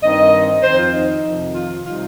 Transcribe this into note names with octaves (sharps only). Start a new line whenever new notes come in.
G2 D#3 C4 D#4 D#5
F2 D#3 C4 C5
F4
D#4
F2 C3 D#3
F4
C3 G3 D#4 F4